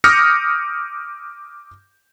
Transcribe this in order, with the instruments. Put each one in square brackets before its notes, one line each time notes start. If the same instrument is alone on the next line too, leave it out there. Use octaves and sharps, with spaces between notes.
[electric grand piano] D6 D#6 F6 G6 A#6 C#7